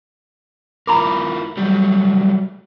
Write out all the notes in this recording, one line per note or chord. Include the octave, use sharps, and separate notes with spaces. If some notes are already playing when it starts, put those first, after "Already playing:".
E4 F4 A#4 A#5 B5 D6
F#3 G3 A3